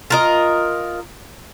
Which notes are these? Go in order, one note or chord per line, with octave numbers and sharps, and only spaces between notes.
F4 A#4 D#5